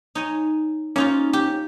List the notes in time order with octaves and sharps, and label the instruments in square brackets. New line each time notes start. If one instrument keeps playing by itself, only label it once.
[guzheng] D#4 C#5 G#5
[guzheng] A#3 D#4 F4 [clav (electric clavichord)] C#4
[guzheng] G4